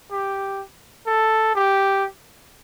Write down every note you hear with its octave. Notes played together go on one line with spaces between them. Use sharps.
G4
A4
G4